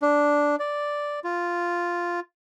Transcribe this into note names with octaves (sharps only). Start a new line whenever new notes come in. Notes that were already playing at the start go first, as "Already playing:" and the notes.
D4
D5
F4